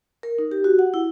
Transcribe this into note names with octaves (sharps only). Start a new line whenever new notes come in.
A#4
D#4
G4
F#4
F#5
E4